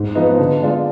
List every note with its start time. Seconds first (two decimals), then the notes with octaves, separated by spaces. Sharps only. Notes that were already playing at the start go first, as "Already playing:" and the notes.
Already playing: G#2
0.15 F3 B3 D#4 B4
0.39 D3
0.62 G#3 D4 F4